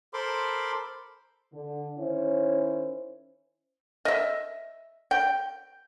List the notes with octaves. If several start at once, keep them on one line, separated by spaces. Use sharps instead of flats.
A4 A#4 C5 B5 C6 D6
D3
D#3 C#4 E4 C5 C#5
D#5 E5
G5